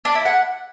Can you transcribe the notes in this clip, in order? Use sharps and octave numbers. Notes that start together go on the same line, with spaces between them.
D4
E4
F#5